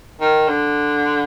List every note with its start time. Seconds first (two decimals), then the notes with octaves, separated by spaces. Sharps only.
0.21 D#3
0.48 D3